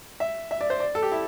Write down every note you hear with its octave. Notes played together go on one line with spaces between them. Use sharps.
E5
E5
D5
C5
D5
A4
G4
E4